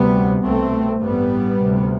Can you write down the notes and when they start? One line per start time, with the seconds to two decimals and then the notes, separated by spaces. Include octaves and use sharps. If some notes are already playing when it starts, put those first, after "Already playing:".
Already playing: D2 C3 G3 B3
0.43 C2 B2 A3 C4
1.02 A1 G2 G3 B3
1.60 D2 C3